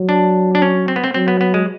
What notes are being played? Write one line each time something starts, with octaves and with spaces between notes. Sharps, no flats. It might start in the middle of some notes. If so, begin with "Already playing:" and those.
Already playing: F#3
D4
D4
C#4
C4
B3
C4
F#3 C4
B3
B3
G#3